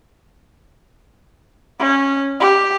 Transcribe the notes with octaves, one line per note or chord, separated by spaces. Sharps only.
C#4
G4